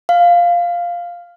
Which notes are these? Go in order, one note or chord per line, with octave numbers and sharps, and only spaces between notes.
F5